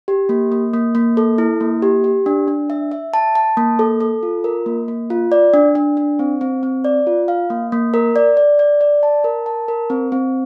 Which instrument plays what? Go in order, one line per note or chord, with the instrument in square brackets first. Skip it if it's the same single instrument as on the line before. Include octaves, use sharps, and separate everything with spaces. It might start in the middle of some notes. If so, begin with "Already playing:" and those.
[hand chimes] G4
A#3
A#3
A#3
A#3
A4
E4
A#3
G4
G4
D4
D4
E5
E5
A5
A5
A#3
A4
A4
F4
A#4
A#3
A#3
F4
D5
D4
D4
D4
C4
C4
C4
D5
F4
F5
A#3
A#3
A#4
D5
D5
D5
D5
A5
A#4
A5
A#4
C4
C4